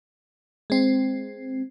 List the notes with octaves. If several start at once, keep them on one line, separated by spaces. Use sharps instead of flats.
G#3 C4